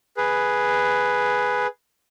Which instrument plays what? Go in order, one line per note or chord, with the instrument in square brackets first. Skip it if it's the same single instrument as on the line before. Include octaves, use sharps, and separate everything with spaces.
[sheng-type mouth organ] G#4 B4